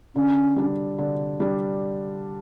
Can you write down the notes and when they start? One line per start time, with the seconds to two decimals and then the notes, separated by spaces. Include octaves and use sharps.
0.15 D3 C#4
0.56 G3 D4
0.98 D3
1.40 G3 D4